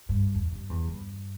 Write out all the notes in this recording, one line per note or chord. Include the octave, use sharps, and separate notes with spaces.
G2
E2
G2
E2
G2